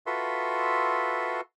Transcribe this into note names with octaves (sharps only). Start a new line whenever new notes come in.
F4 F#4 A4 B4 E5 C6